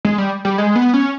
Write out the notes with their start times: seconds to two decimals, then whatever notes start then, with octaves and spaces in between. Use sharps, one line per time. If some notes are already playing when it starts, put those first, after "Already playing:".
0.05 G#3
0.18 G3
0.45 G3
0.58 G#3
0.76 B3
0.94 C#4